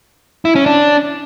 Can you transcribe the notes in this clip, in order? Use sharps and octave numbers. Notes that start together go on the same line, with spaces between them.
E4
C#4
D4